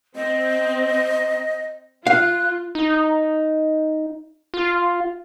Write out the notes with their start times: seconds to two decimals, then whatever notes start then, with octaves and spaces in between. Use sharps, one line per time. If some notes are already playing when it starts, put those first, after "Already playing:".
0.16 C4 D#5
2.07 F4 F5 F#6
2.75 D#4
4.54 F4